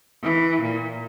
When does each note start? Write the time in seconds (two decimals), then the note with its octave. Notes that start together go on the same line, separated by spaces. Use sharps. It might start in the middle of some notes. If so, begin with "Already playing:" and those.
0.23 E3
0.61 A#2